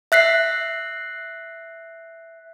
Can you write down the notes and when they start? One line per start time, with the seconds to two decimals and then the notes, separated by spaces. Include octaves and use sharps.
0.12 E5 F#6 B6 C7